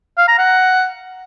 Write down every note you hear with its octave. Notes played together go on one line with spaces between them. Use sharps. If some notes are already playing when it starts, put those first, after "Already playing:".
F5
A#5
F#5